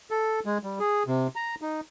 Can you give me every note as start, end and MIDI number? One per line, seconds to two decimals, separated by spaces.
0.11 0.40 69
0.46 0.58 56
0.64 0.79 55
0.80 1.03 68
1.07 1.27 48
1.36 1.55 82
1.62 1.81 63